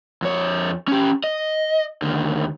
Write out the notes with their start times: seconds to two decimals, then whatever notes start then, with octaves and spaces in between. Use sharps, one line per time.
0.22 F2 C#5
0.88 C#4 G4
1.24 D#5
2.02 D#2 D3